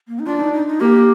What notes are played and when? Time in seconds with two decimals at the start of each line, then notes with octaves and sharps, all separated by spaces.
0.08 A#3
0.19 D#4
0.26 D4 F4
0.40 D#4
0.53 D#4
0.68 D#4
0.80 A#3 G4